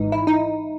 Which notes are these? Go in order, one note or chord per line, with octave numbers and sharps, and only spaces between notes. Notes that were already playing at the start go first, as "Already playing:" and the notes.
Already playing: G#1 G#2 E3 D#4
E4
D#4